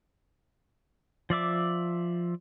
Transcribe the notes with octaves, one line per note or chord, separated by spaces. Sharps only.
F3 D5 E5 D6